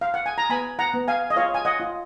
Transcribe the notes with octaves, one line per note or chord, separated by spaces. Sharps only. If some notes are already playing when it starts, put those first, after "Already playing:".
F5
F#5
G#5
A#5
B3 G#5 B5
F#5 A#5
B3
F5 G#5
D#5
F4 C#5 F5
G#5
D#5 F#5
F4